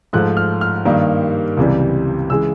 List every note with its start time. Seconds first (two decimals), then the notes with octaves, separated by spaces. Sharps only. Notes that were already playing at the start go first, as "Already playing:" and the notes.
0.13 G#2 F3 A3 F#6
0.37 F6
0.61 F6
0.85 G2 D#3 G3 A#3
1.57 C#2 C3 E3 G3
2.30 C#3 E3 G#3 E6